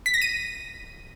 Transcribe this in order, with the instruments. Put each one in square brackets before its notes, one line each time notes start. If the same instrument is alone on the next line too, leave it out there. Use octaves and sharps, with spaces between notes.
[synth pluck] B6
A#6
D#7